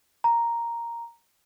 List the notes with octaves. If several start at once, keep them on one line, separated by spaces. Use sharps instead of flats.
A#5